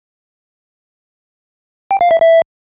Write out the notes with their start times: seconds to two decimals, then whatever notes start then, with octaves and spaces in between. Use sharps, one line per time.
1.91 G5
2.01 F5
2.11 E5
2.21 E5